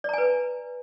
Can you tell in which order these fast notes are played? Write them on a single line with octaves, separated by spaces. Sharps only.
D5 A#5 G#5 B4